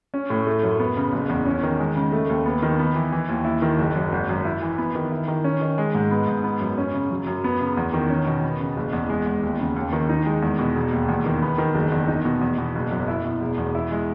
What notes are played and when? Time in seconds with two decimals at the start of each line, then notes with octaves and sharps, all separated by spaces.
0.14 C#4
0.30 A2
0.47 A3
0.63 F#2
0.80 B3
0.97 C#3
1.13 F#1
1.29 E2
1.46 C#4
1.63 D#3
1.79 G#3
1.96 C#3
2.12 A3
2.29 D#2
2.46 B3
2.63 D#3
2.79 B3
2.96 E3
3.12 E3
3.29 D#2
3.45 E4
3.62 D#3
3.79 F#1
3.95 F#2
4.12 G#1
4.29 F#2
4.45 E4
4.62 E3
4.78 B3
4.95 D#3
5.12 E4
5.28 D#3
5.44 C#4
5.61 D#3
5.78 G#3
5.95 G#2
6.11 B3
6.28 G#2
6.44 B3
6.60 F#2
6.78 C#4
6.94 C#3
7.11 F#3
7.27 F#2
7.44 B3
7.61 C#3
7.77 E2
7.94 D#3
8.10 C#4
8.26 B2
8.43 B3
8.60 C#3
8.77 F#1
8.93 E2
9.09 G#3
9.26 E2
9.43 D#2
9.60 C#3
9.76 D#2
9.93 D#3
10.09 D#4
10.26 G#3
10.42 E2
10.59 B2
10.76 E1
10.92 D#2
11.09 E2
11.26 D#3
11.42 B3
11.58 D#3
11.75 F#1
11.92 E2
12.08 D#4
12.25 B2
12.41 E2
12.58 B2
12.75 F#1
12.91 F#2
13.08 E4
13.25 B2
13.41 E1
13.58 E2
13.75 E4
13.92 G#3